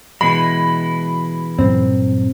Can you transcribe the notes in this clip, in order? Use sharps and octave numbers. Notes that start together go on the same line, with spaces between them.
B2 E3 G#3 B5
G2 A#2 F#3 C4